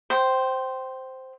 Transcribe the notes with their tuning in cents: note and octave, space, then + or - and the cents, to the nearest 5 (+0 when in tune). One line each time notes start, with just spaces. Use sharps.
C5 +0 G5 -20